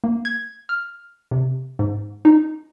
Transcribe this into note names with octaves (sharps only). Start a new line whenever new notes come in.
A#3
G#6
F6
C3
G#2
D#4